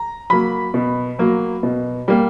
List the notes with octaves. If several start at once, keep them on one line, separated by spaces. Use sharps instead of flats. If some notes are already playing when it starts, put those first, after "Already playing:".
Already playing: A#5
F#3 A#3 B5
B2
F#3 A#3
B2
G3 A#3